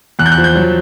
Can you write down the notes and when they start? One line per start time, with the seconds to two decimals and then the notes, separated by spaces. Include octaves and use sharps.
0.19 E2 F#6
0.26 G6
0.32 F#6
0.38 F3
0.44 G6
0.55 F#3